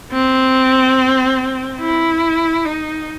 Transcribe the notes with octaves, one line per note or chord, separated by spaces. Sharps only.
C4
E4
D#4